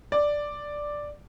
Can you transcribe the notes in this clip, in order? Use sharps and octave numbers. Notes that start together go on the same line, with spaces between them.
D5